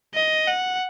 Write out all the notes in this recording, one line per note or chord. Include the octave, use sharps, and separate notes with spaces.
D#5
F#5